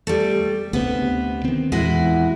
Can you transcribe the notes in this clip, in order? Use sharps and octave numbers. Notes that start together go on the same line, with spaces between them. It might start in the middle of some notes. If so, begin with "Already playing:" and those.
G3 A3
D2 C3 B3
D#3 C4
E2 A#2 E3 G#3 E4 F#4